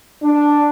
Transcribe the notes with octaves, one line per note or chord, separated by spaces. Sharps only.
D4